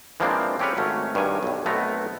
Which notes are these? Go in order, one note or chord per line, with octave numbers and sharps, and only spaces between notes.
E3 F3 G#3 A#3 C4 D4
C4 C#4 G4 A4 B4 C#5
G#1 F#3 A3 C#4
G2 D#3 F#3 G#5
B1 G2
B1 A3 B3 C4 A#4 A#5